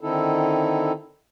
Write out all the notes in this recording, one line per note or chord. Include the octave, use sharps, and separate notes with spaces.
D3 D#3 C4 D#4 E4 A4